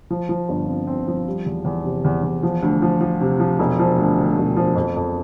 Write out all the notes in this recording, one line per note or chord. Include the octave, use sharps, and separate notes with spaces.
F3
F3
G1
C4
C4
F3
G3
E2
E2
C3
E2
E2
F3
D2
F3
F3
C3
F3
E1
F3
D2
D2
E1
F3
F2
F2